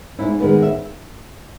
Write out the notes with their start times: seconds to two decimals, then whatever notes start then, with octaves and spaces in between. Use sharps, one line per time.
0.19 G#2 E4
0.40 D#3 G#3 B3 B4
0.63 E5